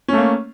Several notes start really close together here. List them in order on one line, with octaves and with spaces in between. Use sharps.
C#4 A3 A#3